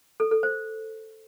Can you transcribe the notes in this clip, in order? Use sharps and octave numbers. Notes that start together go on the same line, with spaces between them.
A4
A4
C5